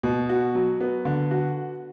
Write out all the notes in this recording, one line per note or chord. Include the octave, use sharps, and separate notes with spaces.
B2
F#4
F#3
B3
D3
F#4